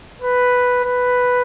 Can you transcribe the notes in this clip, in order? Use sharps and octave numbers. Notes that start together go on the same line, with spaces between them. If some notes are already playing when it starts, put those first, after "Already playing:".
B4
B4